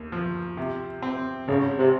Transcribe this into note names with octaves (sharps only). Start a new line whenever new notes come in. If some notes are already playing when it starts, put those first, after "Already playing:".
Already playing: D#2
F3
C3
C4
G#1 C#3
C3